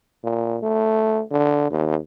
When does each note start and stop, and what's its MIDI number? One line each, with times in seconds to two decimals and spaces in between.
0.24 0.58 46
0.63 1.23 57
1.32 1.69 50
1.71 1.97 39